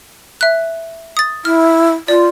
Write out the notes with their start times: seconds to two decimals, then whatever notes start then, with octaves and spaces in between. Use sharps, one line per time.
0.41 E5 F#6
1.17 D#6 A6
1.45 E4 F6
2.08 F4 D5